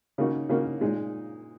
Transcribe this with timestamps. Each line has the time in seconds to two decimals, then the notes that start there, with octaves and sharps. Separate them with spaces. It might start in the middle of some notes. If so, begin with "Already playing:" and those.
0.18 C#3 A#3 D#4 F#4
0.49 C#3 A#3 D#4 F#4
0.81 A#2 G#3 D#4